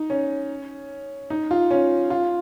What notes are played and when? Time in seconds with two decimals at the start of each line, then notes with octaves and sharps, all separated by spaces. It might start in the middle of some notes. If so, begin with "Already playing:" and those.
Already playing: D#4
0.10 C#4
1.30 D#4
1.51 F4
1.71 C#4
2.10 F4